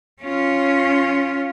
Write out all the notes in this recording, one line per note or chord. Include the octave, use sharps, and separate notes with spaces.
C#4 F4